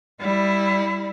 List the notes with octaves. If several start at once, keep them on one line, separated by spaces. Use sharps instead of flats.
G3 E4